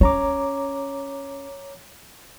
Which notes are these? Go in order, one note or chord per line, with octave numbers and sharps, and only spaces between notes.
C#4 C#5 A#5 D6